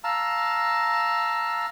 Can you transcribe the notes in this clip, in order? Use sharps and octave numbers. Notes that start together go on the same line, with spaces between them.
F5 A5 A#5 E6